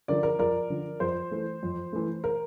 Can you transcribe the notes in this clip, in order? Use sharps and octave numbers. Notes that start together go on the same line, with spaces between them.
D3 F3 A#4 D5
A#4
F2 A#4 D5
D3 F3
F2 C5
E3 A3
F2
E3 A3
A#4